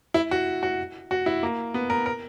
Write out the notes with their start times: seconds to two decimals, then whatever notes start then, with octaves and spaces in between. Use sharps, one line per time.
0.14 E4
0.31 F#4
0.63 F#4
1.11 F#4
1.26 E4
1.43 A#3
1.74 B3
1.90 A#4
2.06 A#4